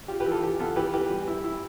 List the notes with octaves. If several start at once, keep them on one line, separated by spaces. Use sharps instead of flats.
F4 G4
G4 B4
E3
F4 A4
E3 G4
B3 F4 A4
E3 G4 B4
E3 G4 B4
G3
E4
E4